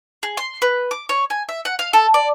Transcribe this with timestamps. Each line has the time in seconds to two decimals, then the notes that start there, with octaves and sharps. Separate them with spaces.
0.23 G#4
0.37 C6
0.62 B4
0.91 D6
1.09 C#5
1.30 G#5
1.49 E5
1.65 F#5
1.79 F5
1.93 A4
2.14 D5